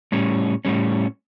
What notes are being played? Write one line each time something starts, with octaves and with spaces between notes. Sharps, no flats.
A2 G3 C#4
A2 G3 C#4